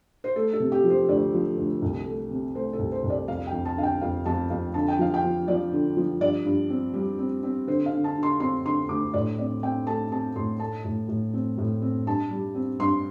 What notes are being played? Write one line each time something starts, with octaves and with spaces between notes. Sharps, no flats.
C5
A3 A4
A4
C3
G4
F3
C5
D2 D5
F3
D2
C2
A3
C3
A3 C5
A4
C2
C5
C2
D5
F2 F5
G5
F2
A5
D3 F5
G5
F2 F5
F2 A5
F2 F5
D3 A5
G5
F3 F5
G5
F3
F3 D5
D3
F3
G2 D5
G2
C4
G3
C4
C4
D3 C5
F5
D3
A5
D3
C6
C4 C6
D3 C6
D2 D6
A2 D5
C4 D5
C4 G5
A3 A5
C4 A5
A2 C6
A3 A5
A2
A2
C4
A2
C4
G2 A5
G3
C4
G2 C6